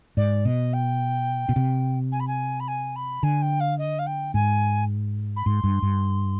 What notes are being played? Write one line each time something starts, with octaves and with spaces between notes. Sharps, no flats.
G#2 D5
B2 D#5
G5
B2
C3
G#5
B5
G#5
B5
G#5
B5
D3 G#5
G5
F5
D#5
F5
G5
G#2 G#5
B5
G#2 C6
G2
G2